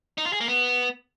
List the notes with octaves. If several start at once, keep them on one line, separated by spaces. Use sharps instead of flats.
D#4
F4
G#4
A#3
B3